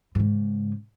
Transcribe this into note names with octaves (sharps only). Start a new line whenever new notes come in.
G#2 C#3